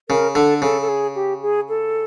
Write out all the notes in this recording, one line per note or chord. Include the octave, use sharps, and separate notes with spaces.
C#3 A#4
D3 A4
C#3 A4
A4
G#4
G4
G#4
A4